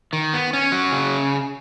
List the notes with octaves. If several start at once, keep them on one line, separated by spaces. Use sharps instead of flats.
D#3
B3
C#4
F#3
C#3